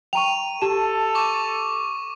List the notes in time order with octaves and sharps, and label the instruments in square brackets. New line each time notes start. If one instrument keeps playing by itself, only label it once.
[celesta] G5 A#5 C#6 [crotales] D#7 F7
[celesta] G4 A5 E7 [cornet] A4
[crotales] C#6 D6